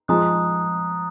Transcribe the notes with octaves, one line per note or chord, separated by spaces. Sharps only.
F3 G#3 A#5 D#6 F#6